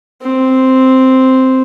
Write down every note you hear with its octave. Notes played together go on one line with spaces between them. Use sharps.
C4